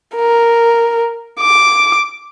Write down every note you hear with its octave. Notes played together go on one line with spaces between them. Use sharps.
A#4
D6